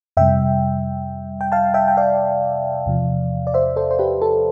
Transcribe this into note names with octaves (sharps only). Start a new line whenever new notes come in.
F2 C3 G3 E5 G5
G5
F5 A5
E5 G5
G5
D5 F5
E2 C3 F3
D5
C5 E5
A4 C5
C5
G4 B4
A4